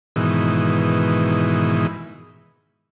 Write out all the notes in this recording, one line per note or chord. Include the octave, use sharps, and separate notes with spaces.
G#2 B2 D#3 E3